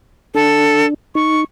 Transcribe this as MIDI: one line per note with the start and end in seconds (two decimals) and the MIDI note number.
0.35 0.94 62
0.35 0.86 69
1.15 1.44 63
1.15 1.41 85